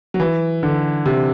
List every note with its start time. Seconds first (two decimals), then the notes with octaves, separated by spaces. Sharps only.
0.14 F#3
0.20 E3
0.63 D3
1.06 C3